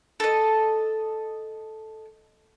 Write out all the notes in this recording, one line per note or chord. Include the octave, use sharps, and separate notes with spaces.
A4 D#5